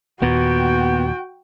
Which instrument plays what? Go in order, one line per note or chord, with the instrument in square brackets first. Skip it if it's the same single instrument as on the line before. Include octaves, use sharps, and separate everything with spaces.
[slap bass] D#2 A#2 [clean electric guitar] B3 [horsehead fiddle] F#4 G5